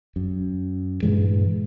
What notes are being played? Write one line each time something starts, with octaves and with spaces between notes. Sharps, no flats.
F#2
G2 A#2 E3 G#3